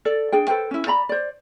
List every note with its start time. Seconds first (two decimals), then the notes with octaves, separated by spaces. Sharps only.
0.05 A4 D5
0.32 D4 G#4 G5
0.47 A4 B4 C5 G5
0.71 C#4 E4
0.87 D5 A#5 B5
1.09 C5 D5